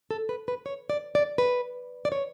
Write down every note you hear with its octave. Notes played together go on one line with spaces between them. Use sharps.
A4
B4
B4
C#5
D5
D5
B4
D5
C#5